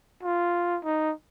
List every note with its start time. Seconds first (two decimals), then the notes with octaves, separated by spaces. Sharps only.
0.23 F4
0.84 D#4